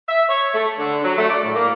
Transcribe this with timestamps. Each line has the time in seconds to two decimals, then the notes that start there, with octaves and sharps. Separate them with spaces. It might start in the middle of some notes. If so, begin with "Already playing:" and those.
0.08 E5
0.28 C#5
0.54 A3
0.79 D3
1.03 F#3
1.17 A3
1.30 D5
1.42 A2
1.55 A#3